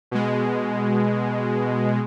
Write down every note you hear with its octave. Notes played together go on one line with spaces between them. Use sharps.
B2 G#3